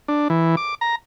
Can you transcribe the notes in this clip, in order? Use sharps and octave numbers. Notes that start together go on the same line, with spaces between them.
D4
E3
D6
A#5